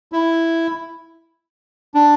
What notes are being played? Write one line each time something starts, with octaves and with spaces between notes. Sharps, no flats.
E4
D4